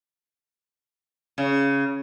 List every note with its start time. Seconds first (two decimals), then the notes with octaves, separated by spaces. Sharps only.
1.38 C#3